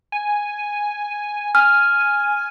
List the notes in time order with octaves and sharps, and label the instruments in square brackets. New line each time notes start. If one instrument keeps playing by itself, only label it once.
[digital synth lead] G#5
[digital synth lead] G#5 [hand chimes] F6